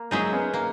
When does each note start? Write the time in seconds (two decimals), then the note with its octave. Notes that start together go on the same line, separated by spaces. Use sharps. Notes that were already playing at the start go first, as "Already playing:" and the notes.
Already playing: A#3
0.11 F#3 G#3 D#4 G#4 C5 E5
0.33 B3 C#4
0.54 A#3